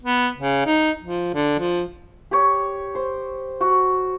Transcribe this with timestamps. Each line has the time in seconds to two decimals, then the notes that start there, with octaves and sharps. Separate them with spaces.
0.03 B3
0.38 C#3
0.66 D#4
1.03 F3
1.34 D3
1.59 F3
2.31 G4 C#5
2.95 C5
3.61 F#4